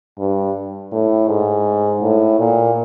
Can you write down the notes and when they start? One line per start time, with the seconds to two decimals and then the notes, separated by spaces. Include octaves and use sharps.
0.18 G2
0.92 A2
1.28 G#2
2.02 A2
2.39 A#2